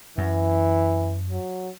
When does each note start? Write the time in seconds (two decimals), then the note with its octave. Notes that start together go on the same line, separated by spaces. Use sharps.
0.18 F#2 E3
1.30 F#3